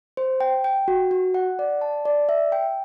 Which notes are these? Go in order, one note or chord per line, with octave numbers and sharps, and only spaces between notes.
C5
G5
G5
F#4
F#4
F#5
D5
A5
D5
E5
G5